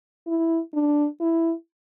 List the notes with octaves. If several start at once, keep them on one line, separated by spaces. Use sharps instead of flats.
E4
D4
E4